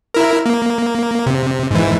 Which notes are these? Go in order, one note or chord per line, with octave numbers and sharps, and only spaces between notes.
E4 A#4
A#3
C3
G#2 E3